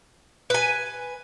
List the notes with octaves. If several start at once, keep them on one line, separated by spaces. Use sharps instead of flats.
B4 G#5